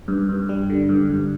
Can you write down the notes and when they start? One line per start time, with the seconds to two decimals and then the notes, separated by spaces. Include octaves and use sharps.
0.08 G2
0.29 G2
0.49 G3
0.70 D3
0.89 G2
1.09 G2